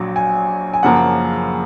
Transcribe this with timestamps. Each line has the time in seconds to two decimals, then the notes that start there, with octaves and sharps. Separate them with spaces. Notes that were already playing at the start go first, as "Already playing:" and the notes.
Already playing: A#1 A#2 F#3
0.16 G#5
0.74 G#5
0.83 F#1 F#2 C#3 F3 A#3 F#5